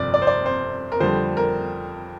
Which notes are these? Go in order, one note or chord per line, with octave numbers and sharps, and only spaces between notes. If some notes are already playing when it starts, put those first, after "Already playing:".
Already playing: G1 F2 C3 D5
D5
C5
D5
C5
A#4
F2 D3 G3 C5
A#4